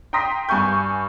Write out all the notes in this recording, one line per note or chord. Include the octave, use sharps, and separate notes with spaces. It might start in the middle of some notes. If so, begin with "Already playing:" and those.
G5 A#5 C6 D#6 A#6 B6
G2 G#5 C#6 G6